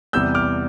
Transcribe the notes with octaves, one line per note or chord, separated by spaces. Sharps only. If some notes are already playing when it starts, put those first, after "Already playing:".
E2 C3 G3 B3 E6 G6
D6 F6